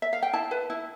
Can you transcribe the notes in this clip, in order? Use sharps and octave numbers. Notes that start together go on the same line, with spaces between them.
E5
F5
G5
E4 A5
B4
E4